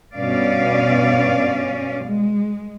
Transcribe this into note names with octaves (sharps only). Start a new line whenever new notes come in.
G2 B2 C#4 D5 F5
G#3